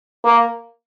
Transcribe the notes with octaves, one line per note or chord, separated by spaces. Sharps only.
A#3